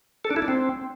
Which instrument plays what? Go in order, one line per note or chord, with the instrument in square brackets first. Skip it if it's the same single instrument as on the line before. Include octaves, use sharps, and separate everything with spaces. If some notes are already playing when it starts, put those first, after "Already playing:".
[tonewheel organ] A4
D4
E4
D4
C4